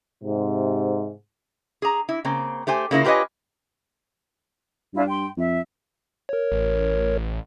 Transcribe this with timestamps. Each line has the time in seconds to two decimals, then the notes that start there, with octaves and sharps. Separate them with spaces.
0.23 G#2 C3
1.82 G#4 A#5
2.09 E4
2.25 C#3 A#3 C4
2.67 A3 G4 C5 G#5
2.91 C#3 A#3 E4 F4
3.05 F4 G4 B4 C#5 D#5 G#5
4.93 G2 D4 E4 F4
5.07 G5 C6
5.37 F2 E5
6.29 A#4 C#5
6.52 A1